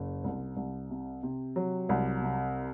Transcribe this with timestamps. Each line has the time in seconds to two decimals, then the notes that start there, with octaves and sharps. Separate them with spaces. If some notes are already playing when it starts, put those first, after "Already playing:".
Already playing: F#1
0.24 C2
0.57 C2
0.90 C3
1.23 C3
1.56 F#3
1.89 C2
2.22 C3